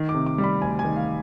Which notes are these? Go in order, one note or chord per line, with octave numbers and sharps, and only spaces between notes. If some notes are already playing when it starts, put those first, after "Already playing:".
Already playing: D#3
D6
C3
D6
G3
B5
D2 G#5
G#5
D#3
F5